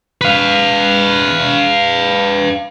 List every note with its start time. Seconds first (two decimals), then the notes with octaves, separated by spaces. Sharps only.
0.21 B4 F5